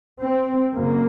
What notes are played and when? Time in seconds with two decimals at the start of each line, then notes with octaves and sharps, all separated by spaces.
0.22 C4
0.73 F#2 C#3 A#3